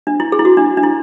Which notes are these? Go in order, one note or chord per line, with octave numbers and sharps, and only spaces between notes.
D4
E4
G#4
E4
F#4
D4
D4
E4